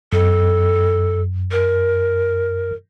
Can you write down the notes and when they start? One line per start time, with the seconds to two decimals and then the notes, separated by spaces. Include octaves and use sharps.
0.13 F#2 A4
1.51 A#4